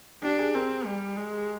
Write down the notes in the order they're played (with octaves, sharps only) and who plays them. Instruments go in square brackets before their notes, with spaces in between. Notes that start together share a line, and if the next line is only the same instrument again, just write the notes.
[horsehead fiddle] D4 [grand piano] G4
[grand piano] G#4
[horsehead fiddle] C4 [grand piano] A#4
[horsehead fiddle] G3
G#3